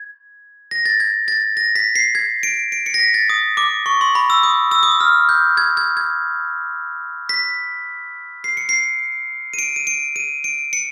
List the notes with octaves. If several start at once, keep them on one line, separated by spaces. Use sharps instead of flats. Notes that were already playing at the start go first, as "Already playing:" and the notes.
Already playing: G#6
A#6
A6
G#6
A6
A#6
B6
C7
G#6
D7
D7
C#7
A#6
B6
A6
D#6
D6
C#6
C6
B5
E6
D#6
E6
D#6
E6
F6
G6
G#6
G#6
G#6
B6
C7
C#7
C7
D#7
D7
D#7
D7
D#7
D7
C#7